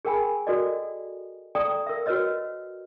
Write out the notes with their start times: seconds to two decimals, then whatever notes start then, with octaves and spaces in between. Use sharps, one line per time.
0.05 G#4 A#4 G5 G#5 B5
0.47 F#4 A4 A#4 D5 D#5
1.55 A4 D5 G5 A#5 D#6
1.87 A#4 E5
2.06 F#4 A#4 B4 C#5 D#5 E6